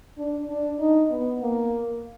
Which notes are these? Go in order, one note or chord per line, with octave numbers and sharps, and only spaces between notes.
D4
D4
D#4
B3
A#3